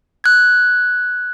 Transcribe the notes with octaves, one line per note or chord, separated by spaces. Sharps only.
F#6 G#6